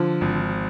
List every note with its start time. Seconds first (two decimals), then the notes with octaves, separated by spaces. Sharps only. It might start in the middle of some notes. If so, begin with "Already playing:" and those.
Already playing: D3 F3
0.21 G#1